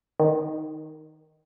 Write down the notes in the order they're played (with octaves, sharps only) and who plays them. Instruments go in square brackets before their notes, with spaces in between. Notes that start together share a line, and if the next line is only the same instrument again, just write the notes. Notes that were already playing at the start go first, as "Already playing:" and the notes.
[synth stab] D#3